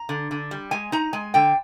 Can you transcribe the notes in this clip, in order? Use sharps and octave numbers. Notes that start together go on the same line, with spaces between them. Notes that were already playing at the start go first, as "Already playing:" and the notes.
Already playing: A#5
D3
D3
G3
G#3 G#5
D#4 A#5
G#3 G#5
D3 G5